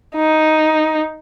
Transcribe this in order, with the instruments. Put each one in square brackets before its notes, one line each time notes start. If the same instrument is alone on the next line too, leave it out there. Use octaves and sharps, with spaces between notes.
[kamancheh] D#4